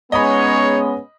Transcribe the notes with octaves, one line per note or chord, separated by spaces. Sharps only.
G#3 B3 C#4 D#4 G#4 C#5 D#5 B5